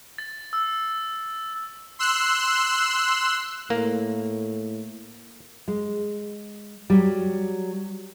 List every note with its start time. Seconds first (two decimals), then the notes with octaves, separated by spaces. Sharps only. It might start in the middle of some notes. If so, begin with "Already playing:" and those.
0.18 A6
0.53 E6
1.99 C6 E6 F#6
3.70 A2 A#3
5.68 G#3
6.90 F#3 G3